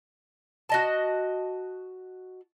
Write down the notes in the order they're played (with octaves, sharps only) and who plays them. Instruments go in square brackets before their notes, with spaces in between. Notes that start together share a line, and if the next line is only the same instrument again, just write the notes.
[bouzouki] F#4 D#5 A5